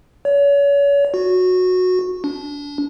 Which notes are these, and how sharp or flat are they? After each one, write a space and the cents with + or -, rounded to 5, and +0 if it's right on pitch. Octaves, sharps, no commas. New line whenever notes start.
C#5 +35
F#4 -15
D4 -30